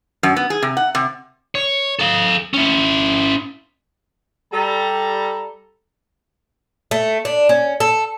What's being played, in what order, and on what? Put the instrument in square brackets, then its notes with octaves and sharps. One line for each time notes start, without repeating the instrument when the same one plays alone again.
[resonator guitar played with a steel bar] F#2
B3
G#4
C3
F#5
C3
[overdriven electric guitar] C#5
A4 F5
C#4 E4
[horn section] G3 A4 A#5
[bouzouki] A3
D4
C#4
A4